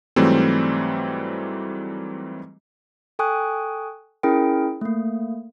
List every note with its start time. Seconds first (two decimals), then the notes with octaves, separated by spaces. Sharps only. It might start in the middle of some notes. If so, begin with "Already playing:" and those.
0.16 G#2 E3 F#3 G3 A3 C4
3.19 A4 G5 G#5 C#6 D#6 F#6
4.23 C#4 E4 G#4 A#4 G5
4.81 A3 A#3